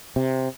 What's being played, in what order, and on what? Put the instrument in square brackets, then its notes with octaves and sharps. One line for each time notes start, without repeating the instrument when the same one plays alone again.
[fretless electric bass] C3